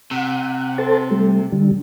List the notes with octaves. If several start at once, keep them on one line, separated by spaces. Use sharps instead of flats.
C3 F#5
A4 C5 A5
G3 A3
D3 G3